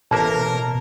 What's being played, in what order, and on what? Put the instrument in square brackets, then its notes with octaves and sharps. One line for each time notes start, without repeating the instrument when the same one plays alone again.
[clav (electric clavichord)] A1 A#3 E5 [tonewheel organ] B2 [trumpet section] A#4 [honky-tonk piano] A5